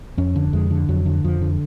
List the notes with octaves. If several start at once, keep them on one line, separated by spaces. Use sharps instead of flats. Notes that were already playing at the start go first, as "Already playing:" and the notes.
F2 C#4
D3
F2 G#3
D3
F2 F#3
D3
F2 F3
D3